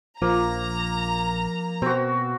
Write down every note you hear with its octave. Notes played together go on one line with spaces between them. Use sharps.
A#1 F3 A#3 A#5
B2 C4 F#4